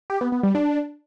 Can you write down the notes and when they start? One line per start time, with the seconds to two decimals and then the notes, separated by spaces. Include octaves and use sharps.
0.10 G4
0.21 B3
0.32 B3
0.43 G3
0.55 D4